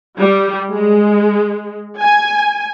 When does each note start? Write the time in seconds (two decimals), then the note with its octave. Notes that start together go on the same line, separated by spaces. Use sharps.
0.19 G3
0.72 G#3
2.01 G#5